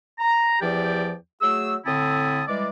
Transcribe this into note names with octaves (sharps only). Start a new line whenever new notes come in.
A#5
E2 F3 G4 D5 G5
F#3 A3 G#4 E6
A2 D3 C4 E4 A5 D#6
E3 G3 G#3 D5